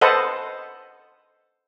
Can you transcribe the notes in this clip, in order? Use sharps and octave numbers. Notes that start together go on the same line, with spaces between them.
A4 B4 C5 D#5 F#5 A5